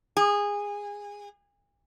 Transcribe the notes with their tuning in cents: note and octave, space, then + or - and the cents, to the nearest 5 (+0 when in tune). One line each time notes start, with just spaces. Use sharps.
G#4 -20